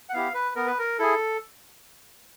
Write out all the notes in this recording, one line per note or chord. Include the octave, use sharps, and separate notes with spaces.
F#5
B3 E4 G4 F5
B4
B3 A#4
B4
A#4
E4 G#4 A4